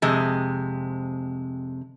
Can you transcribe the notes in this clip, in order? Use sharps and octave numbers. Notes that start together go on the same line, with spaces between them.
F2 C3 G#3